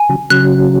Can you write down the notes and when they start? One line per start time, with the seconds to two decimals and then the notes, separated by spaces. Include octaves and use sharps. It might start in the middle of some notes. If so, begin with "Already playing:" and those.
Already playing: G#5
0.09 C#3 F#3
0.30 C#3 F#3 F#6